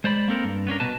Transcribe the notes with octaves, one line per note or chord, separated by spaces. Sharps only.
G#3 C5 D5 B5
A#3 C4 A4 A#4
G2
B3 C#4 D4 A#4
B2 B4 A5